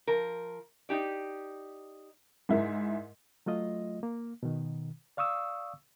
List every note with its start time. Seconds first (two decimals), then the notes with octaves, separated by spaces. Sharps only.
0.07 F3 A#4
0.89 D#4 G4 D5
2.49 G#2 E4 A#4
3.46 F#3 A3 F4 D#5
4.03 A#3
4.43 B2 D#3
5.17 D5 F5 C#6 D#6 E6